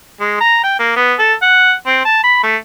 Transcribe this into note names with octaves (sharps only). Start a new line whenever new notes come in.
G#3
A#5
G5
A#3
B3
A4
F#5
C4
A5
B5
A3